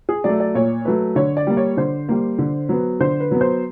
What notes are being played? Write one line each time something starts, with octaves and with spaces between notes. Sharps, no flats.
G#4
F#3 A3 D5
D5
A#2 C#5
F#3 A3 B4
D3 C#5
D5
G3 A#3
C#5
D3 C5
G3 A#3
D3
F#3 B3
D3 C5
B4
F#3 B3
C5